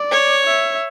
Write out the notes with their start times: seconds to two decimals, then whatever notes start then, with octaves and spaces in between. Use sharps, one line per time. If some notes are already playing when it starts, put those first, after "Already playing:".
Already playing: D5
0.11 C#5
0.46 E5